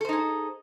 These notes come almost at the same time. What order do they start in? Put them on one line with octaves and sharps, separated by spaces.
A4 C5 D#4 G#4